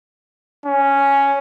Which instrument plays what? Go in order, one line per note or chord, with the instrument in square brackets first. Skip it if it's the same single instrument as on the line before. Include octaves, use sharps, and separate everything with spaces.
[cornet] C#4